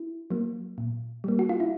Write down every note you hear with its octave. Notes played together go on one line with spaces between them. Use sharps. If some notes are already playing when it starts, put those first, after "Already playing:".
Already playing: E4
F#3 A#3
A#2
G3 A#3
F#4
F4
E4